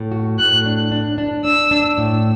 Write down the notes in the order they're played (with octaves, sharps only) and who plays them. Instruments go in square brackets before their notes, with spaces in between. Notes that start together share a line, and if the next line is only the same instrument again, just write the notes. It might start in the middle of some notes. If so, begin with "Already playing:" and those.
Already playing: [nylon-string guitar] A2
F#4
[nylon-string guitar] A2 [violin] F#6
[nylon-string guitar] D4
D4
D4
[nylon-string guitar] D4 [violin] E6
[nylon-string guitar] D4
A2